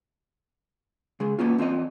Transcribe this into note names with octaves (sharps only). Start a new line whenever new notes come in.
C#3 G#3 G#4
A#3 B3 C#4 F4
E2 C4 F4 D#5